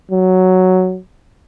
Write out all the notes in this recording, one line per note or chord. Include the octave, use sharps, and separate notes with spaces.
F#3